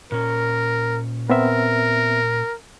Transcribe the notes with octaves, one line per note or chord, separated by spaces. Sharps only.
A#2 C#4 A#4
B3 C4 A#4 E5